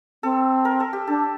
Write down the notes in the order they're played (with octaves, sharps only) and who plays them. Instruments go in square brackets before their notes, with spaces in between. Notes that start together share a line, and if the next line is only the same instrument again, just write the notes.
[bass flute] C4 [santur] A4
[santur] A#4
A4
G4
[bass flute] D4 [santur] A4